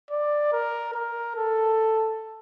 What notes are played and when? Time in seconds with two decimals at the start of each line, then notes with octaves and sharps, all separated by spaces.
0.11 D5
0.53 A#4
0.94 A#4
1.36 A4